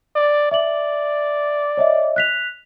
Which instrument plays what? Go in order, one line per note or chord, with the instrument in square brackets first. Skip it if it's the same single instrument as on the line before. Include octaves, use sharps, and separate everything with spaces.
[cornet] D5
[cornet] D5 [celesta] E5 F#7
[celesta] C#5 D#5 E5
F#6 B6 F7